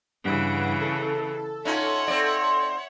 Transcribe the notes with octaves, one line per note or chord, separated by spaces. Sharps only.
G2 C#3 E3 F#5 D7
A4
C#4 D#4 F4 C#5 E5 F#5
C4 D5